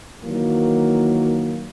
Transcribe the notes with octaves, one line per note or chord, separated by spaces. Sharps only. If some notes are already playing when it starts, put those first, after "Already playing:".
D#3 E3 F#3 A#3